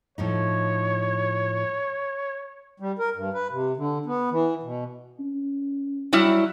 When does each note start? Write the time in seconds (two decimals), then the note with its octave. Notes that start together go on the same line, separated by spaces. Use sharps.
0.18 A2 F3 D#4 C#5
2.80 G3
2.99 A#4
3.16 G2
3.34 B4
3.51 C3
3.77 D3
4.06 B3
4.31 E3
4.63 B2
5.20 C#4
6.13 F#3 G3 E4